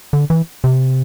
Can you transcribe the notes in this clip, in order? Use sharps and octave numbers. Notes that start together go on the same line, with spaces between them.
D3
E3
C3